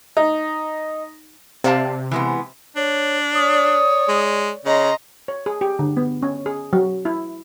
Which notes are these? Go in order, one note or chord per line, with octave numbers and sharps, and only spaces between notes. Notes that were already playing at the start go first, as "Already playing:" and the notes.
D#4
C3 D5 F5 A5
E3 G#3 B3
D4 C#5
C#5 D5 D#6
G#3
C#3 C#5 D#5 A#5 C6
C#5
G#4
G4
D3
B3
C#4
G#4
F#3
E4